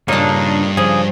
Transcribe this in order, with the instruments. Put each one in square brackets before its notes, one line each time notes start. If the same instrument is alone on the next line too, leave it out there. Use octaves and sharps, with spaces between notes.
[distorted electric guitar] G2 G3 [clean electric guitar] A#2 A#3 D#4 [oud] C#3 D4
[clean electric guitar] C#3 G#4 [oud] F3